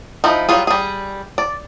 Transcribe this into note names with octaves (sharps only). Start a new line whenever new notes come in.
F3 D#4 E4
F#3 G3 F4 G#4
G3 G#4
D5